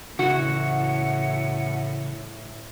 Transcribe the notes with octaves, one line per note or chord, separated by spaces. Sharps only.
A2 C#3 E3 E4 F#4 F#5